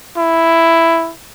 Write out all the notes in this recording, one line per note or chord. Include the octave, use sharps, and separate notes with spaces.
E4